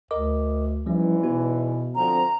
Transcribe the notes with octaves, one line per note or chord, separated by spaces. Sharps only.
D2 A#4 D#5 D6
E2 G#2 E3 F3 G3 C#4
B2 B3 F#4
D3 F3 C4 A#5